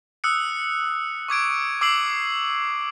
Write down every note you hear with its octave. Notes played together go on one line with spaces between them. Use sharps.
D#6 E6 F#6 C#7
C#6 D6 G#6 D7
D6 E6 C7 D7 F#7